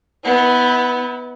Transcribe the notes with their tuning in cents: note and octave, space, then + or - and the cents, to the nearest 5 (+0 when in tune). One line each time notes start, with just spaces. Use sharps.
B3 +0 E4 -35